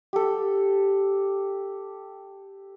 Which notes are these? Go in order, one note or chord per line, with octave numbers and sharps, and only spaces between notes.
G4 A4